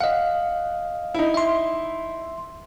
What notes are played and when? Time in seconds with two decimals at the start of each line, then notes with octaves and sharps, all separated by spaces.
0.01 D#5 F5 F#5
1.14 D#4 E4
1.34 E5 C6